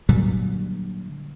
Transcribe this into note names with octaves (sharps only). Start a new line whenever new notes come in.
A#2 D3 F#3 G3